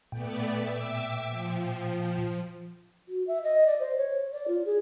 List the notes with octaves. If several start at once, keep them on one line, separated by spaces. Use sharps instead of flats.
A#2 A3 B3 D5 G5
E5 D6
F3
F#4
E5
D#5
D5
C5
C#5
D5
F4
G#4